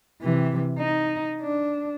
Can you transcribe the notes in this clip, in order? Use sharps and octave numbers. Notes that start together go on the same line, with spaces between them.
C3 E3
D#4
D4